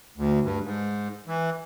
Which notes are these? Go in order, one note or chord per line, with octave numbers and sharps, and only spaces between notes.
D2
G2
G#2
E3